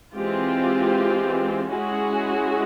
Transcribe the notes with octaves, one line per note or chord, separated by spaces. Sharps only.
E3 G#3 C4 F4 G4
G#3 C#4 E4 F#4 G#4